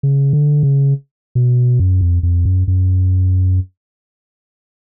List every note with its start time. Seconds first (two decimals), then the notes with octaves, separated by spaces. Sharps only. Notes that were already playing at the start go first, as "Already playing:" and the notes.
0.03 C#3
0.33 D3
0.63 C#3
1.35 B2
1.79 F#2
2.01 F2
2.23 F2
2.45 F#2
2.68 F#2